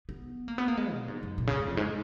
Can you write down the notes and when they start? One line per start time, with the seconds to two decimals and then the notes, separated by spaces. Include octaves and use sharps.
0.09 B3
0.48 A#3
0.58 B3
0.68 A#3
0.77 G#3
0.93 B2
1.08 G#2
1.23 F#2
1.38 A#2
1.47 C#3
1.58 G#2
1.67 F2
1.77 G#2